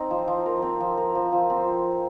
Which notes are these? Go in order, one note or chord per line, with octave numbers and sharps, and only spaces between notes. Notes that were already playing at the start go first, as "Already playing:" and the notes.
Already playing: C4 D#4
F3
F3
A#4
C4
F3
A#4
F3
F3
C4